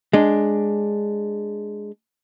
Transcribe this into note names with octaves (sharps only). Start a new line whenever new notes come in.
G#3 D4